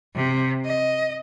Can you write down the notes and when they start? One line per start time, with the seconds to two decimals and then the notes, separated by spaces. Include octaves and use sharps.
0.15 C3
0.64 D#5